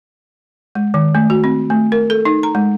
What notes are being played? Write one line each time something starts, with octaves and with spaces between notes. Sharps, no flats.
G#3
D#3
A3
F#4
C4
A3
A#4
A4
D#4
A#5
G#3